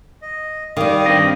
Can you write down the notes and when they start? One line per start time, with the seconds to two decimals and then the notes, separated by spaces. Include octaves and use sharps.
0.22 D#5
0.77 D#3 G3 F5 D6 D#6
1.06 G2 C4 D#5